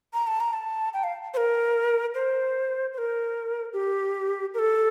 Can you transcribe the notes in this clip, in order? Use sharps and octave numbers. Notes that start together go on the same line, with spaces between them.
A#5
A5
A#5
A5
G5
F5
C5
A#4
C5
C5
A#4
G4
A#4
A4